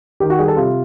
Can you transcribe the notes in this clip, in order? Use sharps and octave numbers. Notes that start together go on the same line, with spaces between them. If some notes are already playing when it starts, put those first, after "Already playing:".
D#3 G4
F#4
G3 G#4
A4
C3 F4